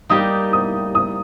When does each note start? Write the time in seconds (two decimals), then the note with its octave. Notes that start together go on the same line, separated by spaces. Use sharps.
0.09 G3 A#3 D#4 G4 D#6
0.53 D#6
0.95 D#6